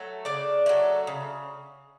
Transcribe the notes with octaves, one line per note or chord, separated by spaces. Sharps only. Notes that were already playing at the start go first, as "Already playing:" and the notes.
Already playing: F#3 A3
C#3 D4 D5
F#3 A3
C#3